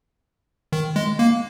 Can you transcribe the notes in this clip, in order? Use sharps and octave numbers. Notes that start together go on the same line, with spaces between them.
D#3
G#3
A#3